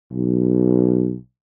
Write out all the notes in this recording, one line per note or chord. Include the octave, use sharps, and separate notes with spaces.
B1